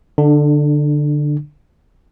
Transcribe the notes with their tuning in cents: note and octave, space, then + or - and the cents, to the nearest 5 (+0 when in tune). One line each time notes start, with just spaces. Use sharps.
D3 +0 D4 +30